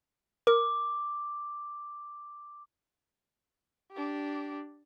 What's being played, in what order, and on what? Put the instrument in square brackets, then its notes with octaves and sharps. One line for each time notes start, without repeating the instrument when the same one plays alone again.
[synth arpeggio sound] A#4 [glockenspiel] D6
[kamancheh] D4 G4